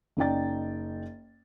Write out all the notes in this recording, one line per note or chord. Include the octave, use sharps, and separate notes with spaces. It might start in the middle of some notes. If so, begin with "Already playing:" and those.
F#1 C#4 D#4 D5 G5 A6